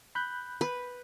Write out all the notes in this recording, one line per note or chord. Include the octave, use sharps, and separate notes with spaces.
B5 F#6 G6
B4